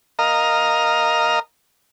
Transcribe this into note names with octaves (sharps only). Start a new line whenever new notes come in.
A#4 D#5 F5 A#5